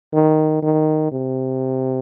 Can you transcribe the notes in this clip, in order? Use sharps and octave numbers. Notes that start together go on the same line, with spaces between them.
D#3
D#3
C3